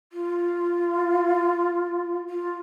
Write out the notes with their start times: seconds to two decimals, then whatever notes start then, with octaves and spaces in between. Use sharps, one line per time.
0.12 F4
2.29 F4